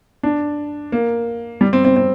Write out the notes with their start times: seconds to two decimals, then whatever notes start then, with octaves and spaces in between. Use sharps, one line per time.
0.23 D4
0.92 A#3
1.61 G3
1.73 C4
1.85 C4
1.96 C4